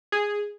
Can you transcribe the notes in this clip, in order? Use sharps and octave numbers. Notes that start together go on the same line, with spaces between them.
G#4